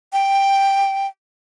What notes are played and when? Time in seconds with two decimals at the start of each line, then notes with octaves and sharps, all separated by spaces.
0.13 G5